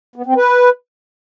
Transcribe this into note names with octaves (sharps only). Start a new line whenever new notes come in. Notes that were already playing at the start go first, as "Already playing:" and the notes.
B3
C4
B4